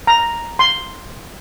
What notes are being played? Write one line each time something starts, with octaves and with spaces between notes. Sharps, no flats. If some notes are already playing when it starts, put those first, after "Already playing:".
A#5
C6